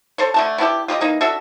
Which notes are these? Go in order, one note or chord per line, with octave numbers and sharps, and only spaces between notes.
A4 C5 C#5
D3 A3 A5
B3 D4 E4 G4
F4 G4 A#4 D#5
E3 A#3 D#4
D4 F#4 A4 E5